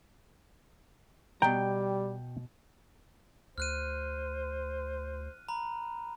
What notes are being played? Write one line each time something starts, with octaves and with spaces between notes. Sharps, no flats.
B2 G3 G5 A#5
D2 C5 F6 F#6 D#7
A#5 B5